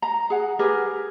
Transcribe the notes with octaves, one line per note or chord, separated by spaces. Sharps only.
A#5
G#4 F#5
G4 G#4 A#4 B4